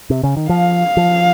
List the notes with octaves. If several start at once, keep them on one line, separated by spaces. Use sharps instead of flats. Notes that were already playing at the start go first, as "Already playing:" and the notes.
C3
C#3
D#3
F3 F5
F3